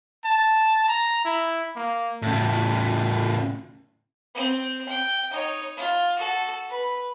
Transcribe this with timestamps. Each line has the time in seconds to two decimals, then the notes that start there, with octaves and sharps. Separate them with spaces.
0.25 A5
0.88 A#5
1.25 E4
1.76 A#3
2.22 A2 C#3
4.35 C4
4.88 G5
5.31 D#4 C#5
5.77 F4
6.18 F#4 A4
6.69 B4